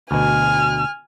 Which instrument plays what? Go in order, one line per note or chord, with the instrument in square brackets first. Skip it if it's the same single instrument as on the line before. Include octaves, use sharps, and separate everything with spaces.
[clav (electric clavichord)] D2 B2 [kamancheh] G#5 F6